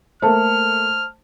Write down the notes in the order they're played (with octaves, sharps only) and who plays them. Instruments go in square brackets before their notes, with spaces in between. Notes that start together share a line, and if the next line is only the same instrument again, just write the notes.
[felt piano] A3 A#3 [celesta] C5 A5 [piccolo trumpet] F6